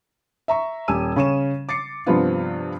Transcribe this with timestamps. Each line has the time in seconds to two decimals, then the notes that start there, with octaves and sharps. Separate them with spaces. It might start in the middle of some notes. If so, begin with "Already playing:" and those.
0.48 E5 A#5 C#6
0.88 D#1 G4 G#5 E6 D#7
1.16 C#3 C#4 C#6 D#7 E7
1.69 D6 A6 C7 C#7
2.06 G2 C3 F3 B3 F4